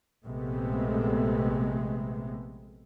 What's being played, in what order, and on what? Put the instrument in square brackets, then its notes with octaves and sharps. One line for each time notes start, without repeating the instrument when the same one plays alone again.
[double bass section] A#1 C3 G#3 A3 B3